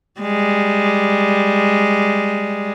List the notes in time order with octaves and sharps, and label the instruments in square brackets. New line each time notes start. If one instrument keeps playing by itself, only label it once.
[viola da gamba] G3 G#3